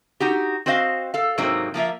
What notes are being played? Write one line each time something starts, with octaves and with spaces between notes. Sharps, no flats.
D#4 F#4 G4
C4 F#4 C5 D#5 F5
A4 F5
G#2 C3 F#3 A#3 C4 D#4
F3 A#3 F4 E5